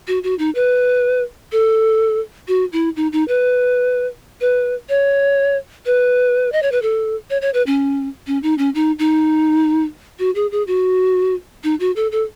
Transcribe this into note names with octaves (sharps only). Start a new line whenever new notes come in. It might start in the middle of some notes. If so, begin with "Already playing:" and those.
F#4
F#4
D#4
B4
A4
F#4
E4
D#4
D#4
B4
B4
C#5
B4
D#5
C#5
B4
A4
C#5
C#5
B4
C#4
C#4
D#4
C#4
D#4
D#4
F#4
G#4
G#4
F#4
D#4
F#4
A4
A4